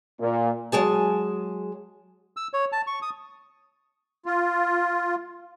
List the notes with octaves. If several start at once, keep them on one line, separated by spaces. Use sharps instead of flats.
A#2
F#3 G#3 G#4 A5
E6
C#5
A5
C#6
D#6
F4